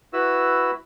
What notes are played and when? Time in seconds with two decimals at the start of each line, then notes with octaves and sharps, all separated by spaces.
0.13 E4 F#4 B4 E6